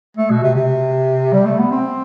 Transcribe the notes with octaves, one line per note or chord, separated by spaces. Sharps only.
A3
B2
C3
C3
G3
A3
B3
C4